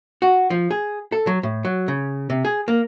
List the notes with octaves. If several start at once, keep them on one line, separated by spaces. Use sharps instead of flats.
F#4
F3
G#4
A4
F#3
A2
F#3
C#3
C3
G#4
A#3